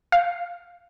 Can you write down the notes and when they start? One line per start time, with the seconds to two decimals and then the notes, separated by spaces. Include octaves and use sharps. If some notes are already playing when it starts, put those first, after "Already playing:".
0.12 F5